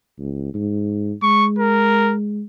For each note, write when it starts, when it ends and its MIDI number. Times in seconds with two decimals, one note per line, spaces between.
0.19 0.51 37
0.54 1.13 44
1.23 2.43 56
1.23 1.47 85
1.59 2.14 70